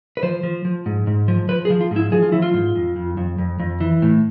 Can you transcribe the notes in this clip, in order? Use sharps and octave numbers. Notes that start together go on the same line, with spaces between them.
B4
F3 C5
F3
F3
G#2
G#2
F3
F3 B4
G#4
F3
F4
G#2
E4
F3 G#4
F4
F3 E4
F4
G#2
F2
F2
F2
F2
F2
E3
A2